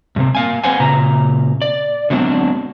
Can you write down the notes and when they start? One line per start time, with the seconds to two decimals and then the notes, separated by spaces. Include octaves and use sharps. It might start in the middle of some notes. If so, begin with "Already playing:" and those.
0.16 G2 C3 C4
0.35 A#3 F5 G#5
0.64 C4 B4 C5 F#5 G#5
0.80 A#2 C#3 A#5
1.62 D5
2.10 D3 F#3 G#3 B3 C4 D4